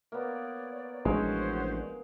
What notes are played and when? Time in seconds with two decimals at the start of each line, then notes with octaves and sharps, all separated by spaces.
0.12 A#3 B3 C#5 D5
1.05 A1 F3 G#3 C#4 D4 F#4 C5